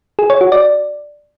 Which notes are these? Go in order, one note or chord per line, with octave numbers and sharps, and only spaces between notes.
G#4
C#5
F#4
D5